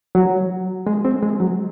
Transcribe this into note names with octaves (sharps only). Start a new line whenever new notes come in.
F#3
G#3
C4
G#3
F#3